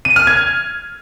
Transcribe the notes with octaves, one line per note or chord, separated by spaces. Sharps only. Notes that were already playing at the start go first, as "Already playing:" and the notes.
D#7
F6
G#6